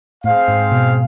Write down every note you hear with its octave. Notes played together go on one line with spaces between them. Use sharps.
A2 C4 G#4 C5 F5
G#2
B2